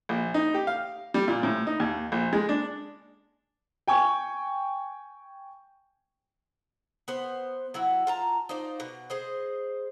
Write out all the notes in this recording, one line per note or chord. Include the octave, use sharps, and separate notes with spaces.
A#1
D#4
G4
F5
G3
A#2
A2
D#4
D#2
A#1
G#3
D4
G5 G#5 C#6
B3 C5
F#3 E4 F#4
F4 A5 A#5
D#4 F4 C5 D5
B2
G#4 C5 D#5